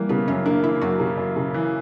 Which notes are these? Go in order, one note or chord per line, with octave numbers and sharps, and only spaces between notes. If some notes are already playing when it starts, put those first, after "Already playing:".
Already playing: E3 G3 A#3
C#3 B3
F#2 C#4
A#3 D4
E3 E4
F#2 F#4
C#3
F#2
C#3
E3